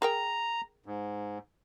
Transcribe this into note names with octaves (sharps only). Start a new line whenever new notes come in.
G#4 A#4 G5 A#5
G#2